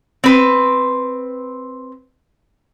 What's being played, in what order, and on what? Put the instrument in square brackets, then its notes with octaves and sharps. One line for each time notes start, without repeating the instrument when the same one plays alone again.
[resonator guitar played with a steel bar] C4 B4